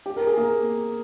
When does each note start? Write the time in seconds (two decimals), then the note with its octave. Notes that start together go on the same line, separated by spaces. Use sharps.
0.06 G4
0.16 A#4
0.27 G#4
0.37 A#3